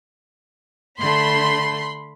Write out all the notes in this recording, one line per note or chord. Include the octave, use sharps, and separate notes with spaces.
D3 A3 B5 C6